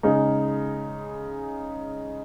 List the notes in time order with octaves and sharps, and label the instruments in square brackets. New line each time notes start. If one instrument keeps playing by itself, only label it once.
[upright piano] C#3 G#3 D#4